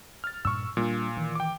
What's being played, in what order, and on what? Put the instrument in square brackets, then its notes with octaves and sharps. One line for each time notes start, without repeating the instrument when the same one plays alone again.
[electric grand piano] F6 A6
[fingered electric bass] G2 A#2 [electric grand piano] C#6 E6
[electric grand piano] A#2 [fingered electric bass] G3 C4 D4
[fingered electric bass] D#3 E3
[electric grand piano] G5 D6